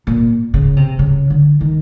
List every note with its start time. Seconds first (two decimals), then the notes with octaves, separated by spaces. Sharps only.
0.07 A#2
0.54 C#3
0.77 C3
0.99 C#3
1.30 D3
1.61 D#3